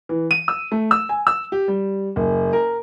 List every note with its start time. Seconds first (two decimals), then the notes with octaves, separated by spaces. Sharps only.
0.09 E3
0.31 D#7
0.48 E6
0.72 A3
0.91 E6
1.09 G#5
1.27 E6
1.52 G4
1.68 G3
2.16 F#1
2.53 A#4